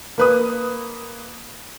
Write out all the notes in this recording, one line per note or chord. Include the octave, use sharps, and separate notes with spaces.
A#3 B4 D#6